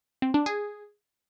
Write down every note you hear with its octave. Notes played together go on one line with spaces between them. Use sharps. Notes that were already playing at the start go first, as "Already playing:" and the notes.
C4
D4
G#4